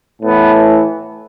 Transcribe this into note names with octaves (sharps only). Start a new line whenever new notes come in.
A2 E3 B3